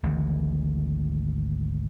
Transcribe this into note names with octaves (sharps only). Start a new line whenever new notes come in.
G#1 D2 G#2 E3